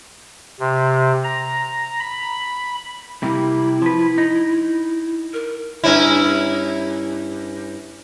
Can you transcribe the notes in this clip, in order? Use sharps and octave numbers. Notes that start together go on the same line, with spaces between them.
C3
A#5
B5
C3 G3 A#3 E4
F3 B4
D#4
A#4
G2 C#4 E4